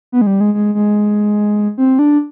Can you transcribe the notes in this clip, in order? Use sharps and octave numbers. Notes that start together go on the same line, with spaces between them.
B3
G#3
G3
G#3
G#3
G#3
C4
D4